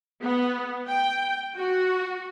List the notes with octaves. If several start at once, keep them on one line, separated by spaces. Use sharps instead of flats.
B3
G5
F#4